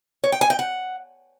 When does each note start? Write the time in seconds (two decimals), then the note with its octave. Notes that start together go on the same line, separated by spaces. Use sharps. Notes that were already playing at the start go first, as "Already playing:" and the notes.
0.24 C#5
0.32 G5
0.41 G#5
0.50 G5
0.59 F#5